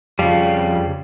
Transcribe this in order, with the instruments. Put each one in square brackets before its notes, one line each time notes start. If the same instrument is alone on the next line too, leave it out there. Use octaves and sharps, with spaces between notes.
[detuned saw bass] F2 [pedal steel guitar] C#3 G3 [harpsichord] F3